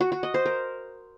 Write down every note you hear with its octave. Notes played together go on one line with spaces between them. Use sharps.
F#4
F#4
D#5
C5
A#4